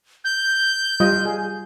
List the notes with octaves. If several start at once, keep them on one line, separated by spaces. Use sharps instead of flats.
G6
G3 F4 D#5
G#4